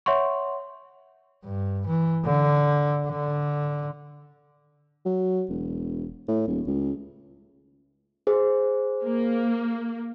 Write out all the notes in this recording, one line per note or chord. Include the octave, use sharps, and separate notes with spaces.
C#5 E5 F#5 C6 C#6
G2
E3
D3
D3
F#3
E1
A2
D#1
C#2
G#4 C5
A#3